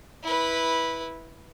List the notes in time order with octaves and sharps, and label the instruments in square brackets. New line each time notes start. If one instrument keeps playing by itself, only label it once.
[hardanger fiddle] E4 B4